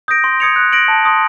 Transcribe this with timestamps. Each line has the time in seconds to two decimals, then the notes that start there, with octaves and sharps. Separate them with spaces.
0.08 D#6 G6 A#6 D7
0.24 C6
0.40 D#6 G#6 C#7 F7
0.56 F#6
0.72 A#6 D7 F#7
0.88 A5
1.05 C6 D#6